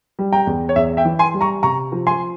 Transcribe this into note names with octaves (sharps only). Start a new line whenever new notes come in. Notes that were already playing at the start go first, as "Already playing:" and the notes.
G3
G5 A#5
E2
C#5
E2 E5
E5 G5
E3
G#5 C6
G3
A#5 C#6
C3 A#5 C#6
F3
G#5 C6